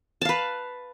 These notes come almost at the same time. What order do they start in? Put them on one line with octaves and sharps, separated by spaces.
A5 F5 B4